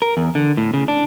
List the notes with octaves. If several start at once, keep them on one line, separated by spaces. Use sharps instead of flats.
A#4
E2
D3
A2
C#3
D4